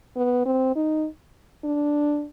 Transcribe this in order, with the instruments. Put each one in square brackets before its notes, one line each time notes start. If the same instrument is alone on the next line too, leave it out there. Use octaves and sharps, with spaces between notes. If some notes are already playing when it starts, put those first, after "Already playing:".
[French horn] B3
C4
D#4
D4